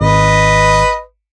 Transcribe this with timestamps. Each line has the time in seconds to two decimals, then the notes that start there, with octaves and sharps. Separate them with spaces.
0.01 G#1 B4 D#5